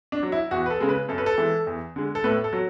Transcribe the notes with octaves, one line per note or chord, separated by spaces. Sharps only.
D4
F#3
E4
E2 F#4
B4
A4
C#3 G#3
B4
F#2 A4
B4
A4
E3 G#3
E2
D3 G#3
A4
A2 B4
A4
F#3